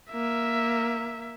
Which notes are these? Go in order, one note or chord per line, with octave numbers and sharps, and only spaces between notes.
A#3 E5